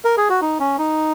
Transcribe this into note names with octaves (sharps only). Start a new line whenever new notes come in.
A#4
G#4
F#4
D#4
C#4
D#4